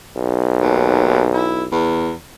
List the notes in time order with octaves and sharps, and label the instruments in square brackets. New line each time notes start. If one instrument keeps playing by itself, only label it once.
[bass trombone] B1
[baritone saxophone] D#2
E4
E2